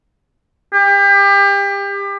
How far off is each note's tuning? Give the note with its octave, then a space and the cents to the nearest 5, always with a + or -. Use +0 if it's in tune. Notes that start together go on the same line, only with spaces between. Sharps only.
G4 +30